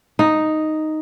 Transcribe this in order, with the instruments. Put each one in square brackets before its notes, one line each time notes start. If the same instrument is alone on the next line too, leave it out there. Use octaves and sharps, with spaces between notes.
[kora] D#4